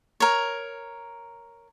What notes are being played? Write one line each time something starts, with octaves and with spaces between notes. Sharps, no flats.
A#4 C#5